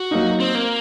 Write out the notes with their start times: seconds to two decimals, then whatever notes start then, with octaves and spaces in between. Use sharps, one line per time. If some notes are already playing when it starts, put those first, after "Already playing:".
Already playing: F#4
0.11 F#3 A#3 D#4
0.40 C4
0.55 A#3